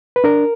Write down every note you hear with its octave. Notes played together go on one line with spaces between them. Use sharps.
B4
D4 A#4